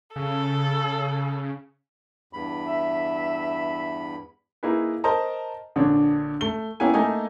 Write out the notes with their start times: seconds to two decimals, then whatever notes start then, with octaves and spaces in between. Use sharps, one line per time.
0.16 C#3 A4
2.33 E2 G2 B5
2.64 E5
4.63 A#3 D#4 E4 G#4 B4
5.04 A#4 C5 D#5 A5 A#5
5.76 A#1 D3 D4 C#5
6.41 A3 G7
6.80 A#3 B3 C#4 E4 G5 G#5
6.94 A3 A#3 D#4 D#5 G#5